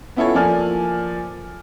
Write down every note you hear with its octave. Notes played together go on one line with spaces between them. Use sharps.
B3 C#4 E4 F4 A4 C#5
F3 A#3 A4 D5 G#5 F6